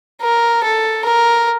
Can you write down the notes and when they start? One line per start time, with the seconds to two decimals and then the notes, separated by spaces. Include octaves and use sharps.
0.22 A#4
0.64 A4
1.05 A#4